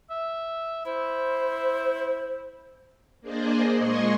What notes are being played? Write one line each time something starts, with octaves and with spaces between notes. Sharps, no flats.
E5
E4 C5
A#3 D4 G#4 C5 D5 D#5
A#2 G#3 D#5 G#5 C6 C#6